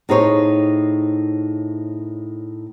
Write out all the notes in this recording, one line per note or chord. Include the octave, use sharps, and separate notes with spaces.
A2 D#4 G#4 C5 C#5